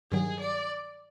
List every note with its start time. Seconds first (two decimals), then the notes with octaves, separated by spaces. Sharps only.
0.11 G2 D#3 F#3 G#4
0.40 D5